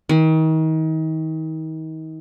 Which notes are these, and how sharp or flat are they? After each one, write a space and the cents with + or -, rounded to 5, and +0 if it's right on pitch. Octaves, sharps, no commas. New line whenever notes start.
D#3 +35